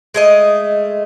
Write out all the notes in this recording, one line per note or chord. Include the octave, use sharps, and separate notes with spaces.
G#3 A3 D#5